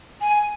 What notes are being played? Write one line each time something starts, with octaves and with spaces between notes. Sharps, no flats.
G#5